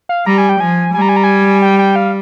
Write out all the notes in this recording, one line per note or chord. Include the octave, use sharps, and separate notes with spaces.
F5
G3 A#5
G#5
G5
F3 G#5
G3 G#5
A#5
G#5
A#5
G#5
G5
G5
F5